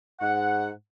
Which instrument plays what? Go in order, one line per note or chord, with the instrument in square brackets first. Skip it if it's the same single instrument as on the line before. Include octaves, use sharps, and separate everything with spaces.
[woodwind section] G#2 F#5